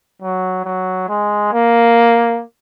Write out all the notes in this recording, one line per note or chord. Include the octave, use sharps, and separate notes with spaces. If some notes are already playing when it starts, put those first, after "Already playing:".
F#3
F#3
G#3
A#3